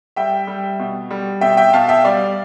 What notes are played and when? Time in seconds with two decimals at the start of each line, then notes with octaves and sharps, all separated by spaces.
0.16 G3 E5 G5
0.47 G3
0.79 B2
1.10 G3
1.41 B2 E5 G5
1.57 E5 G5
1.73 B2 F5 A5
1.89 E5 G5
2.05 G3 D5 F5